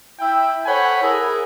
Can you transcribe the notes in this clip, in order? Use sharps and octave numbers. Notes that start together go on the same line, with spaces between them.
E4 E5 G5
A4 C5 C#5 F#5 G#5 B5
E4 G#4 A#4